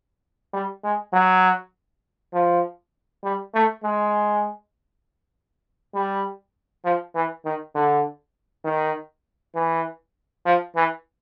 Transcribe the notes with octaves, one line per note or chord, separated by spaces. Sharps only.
G3
G#3
F#3
F3
G3
A3
G#3
G3
F3
E3
D#3
D3
D#3
E3
F3
E3